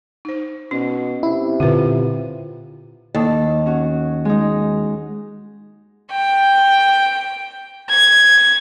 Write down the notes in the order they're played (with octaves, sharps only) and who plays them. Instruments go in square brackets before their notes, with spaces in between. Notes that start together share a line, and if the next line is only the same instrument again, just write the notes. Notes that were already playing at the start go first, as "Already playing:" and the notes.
[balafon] D#4 C5
[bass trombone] B2 [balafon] C#4
[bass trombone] C3 [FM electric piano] E4
[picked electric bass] A#2 D3 [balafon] F4 B4
[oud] D#2 [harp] A4
[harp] C#4 F#4
G#3 D#4
[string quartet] G5
G#6